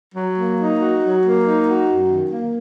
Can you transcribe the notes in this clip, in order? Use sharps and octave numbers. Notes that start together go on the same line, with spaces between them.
F#3
A#3
D#4
F#4
F#3
A#3
D#4
F#4
F#2
D#3
A#3